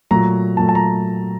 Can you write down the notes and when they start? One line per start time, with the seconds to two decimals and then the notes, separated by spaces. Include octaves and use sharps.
0.11 A#2 F#3 A3 A#5
0.57 A#2 F#3 A3 A5
0.69 A5
0.75 A#5